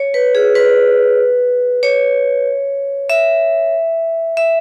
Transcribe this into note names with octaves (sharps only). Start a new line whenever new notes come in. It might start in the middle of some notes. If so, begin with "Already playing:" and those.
Already playing: C#5
B4
G#4
B4
C#5
E5
E5